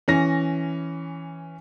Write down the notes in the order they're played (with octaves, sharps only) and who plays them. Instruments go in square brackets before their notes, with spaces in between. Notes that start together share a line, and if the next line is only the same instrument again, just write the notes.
[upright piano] E3 C#4 A#6